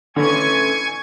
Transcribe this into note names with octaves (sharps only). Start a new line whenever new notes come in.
D3 C#4 A4 B4 G#5 C#6 G#6